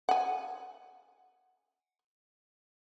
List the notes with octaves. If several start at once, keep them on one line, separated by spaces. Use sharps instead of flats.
F#5 G#5